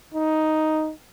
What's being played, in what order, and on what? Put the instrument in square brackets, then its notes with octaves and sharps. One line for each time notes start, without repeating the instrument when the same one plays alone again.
[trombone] D#4